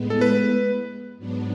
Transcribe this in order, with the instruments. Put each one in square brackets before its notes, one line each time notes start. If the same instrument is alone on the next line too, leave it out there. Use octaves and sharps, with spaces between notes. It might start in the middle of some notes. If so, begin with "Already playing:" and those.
Already playing: [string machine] A2 G#3 B3
[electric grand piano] A4
B4
[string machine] G#2 F#3 B3 D4